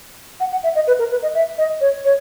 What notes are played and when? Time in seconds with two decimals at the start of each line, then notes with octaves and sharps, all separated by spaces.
0.40 F#5
0.52 F#5
0.63 E5
0.75 D#5
0.87 B4
0.99 A#4
1.11 B4
1.22 D#5
1.34 E5
1.58 D#5
1.81 C#5
2.05 C#5